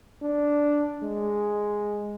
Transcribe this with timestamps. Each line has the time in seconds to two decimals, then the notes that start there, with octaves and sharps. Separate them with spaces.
0.22 D4
1.03 G#3